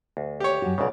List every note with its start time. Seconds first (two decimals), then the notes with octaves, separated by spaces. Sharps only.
0.17 D2
0.40 G4 C#5
0.62 F#2 F#4
0.78 B1 G#2 C#3 C#5 D5